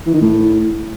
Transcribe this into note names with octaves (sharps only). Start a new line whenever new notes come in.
E3
D#3
A2